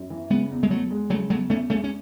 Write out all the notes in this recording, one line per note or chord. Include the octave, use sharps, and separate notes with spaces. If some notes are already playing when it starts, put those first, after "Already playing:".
Already playing: F#2
E3
C#3 G#3 B3
E2
G#3
E2 F#3 A3
G#3
C#3 F#3 A3
E2 F#3 A3
E2 A3 C#4
G#3 A3 C#4
C#4